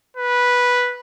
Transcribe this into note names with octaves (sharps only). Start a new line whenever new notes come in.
B4